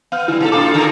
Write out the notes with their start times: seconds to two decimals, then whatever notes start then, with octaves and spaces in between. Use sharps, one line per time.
0.12 B3 F5 F6
0.28 D3 G3 E4
0.41 B2 A4
0.52 A#2 D4 F4 A4 F5 D6
0.74 D3 F4 A#4